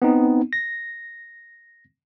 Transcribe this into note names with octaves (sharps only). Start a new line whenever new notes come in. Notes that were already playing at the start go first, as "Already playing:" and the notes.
B3 C4 D#4
A#6